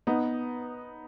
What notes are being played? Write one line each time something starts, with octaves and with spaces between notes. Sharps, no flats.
B3 D#4